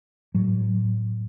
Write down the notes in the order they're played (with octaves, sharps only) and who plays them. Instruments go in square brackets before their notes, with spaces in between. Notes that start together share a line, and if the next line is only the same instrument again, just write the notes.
[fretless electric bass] A2 F#3